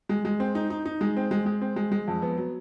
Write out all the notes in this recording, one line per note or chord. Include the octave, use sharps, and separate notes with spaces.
G#3
G#3
C4
D#4
D#4
D#4
G#3
C4
G#3
G#3
C4
G#3
G#3
F2
B3
F#3